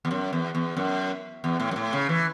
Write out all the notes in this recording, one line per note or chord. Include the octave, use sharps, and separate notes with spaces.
E2
F#2
E2
E2
F#2
E2
A2
F#2
A2
C#3
E3